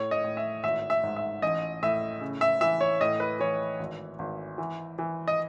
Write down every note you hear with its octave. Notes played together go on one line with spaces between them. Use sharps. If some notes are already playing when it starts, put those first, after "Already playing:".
Already playing: A2 C#5
D#5
A2
E5
G#1 E5
E5
G#2
E5
A1 D#5
A2 E5
C#3
E5
E3 E5
C#5
A2 D#5
B4
E3 C#5
G#1
G#1
E3
E3
D#5